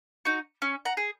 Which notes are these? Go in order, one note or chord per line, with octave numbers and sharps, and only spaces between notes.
D#4 F#4
C#4
F#5 A#5
G#4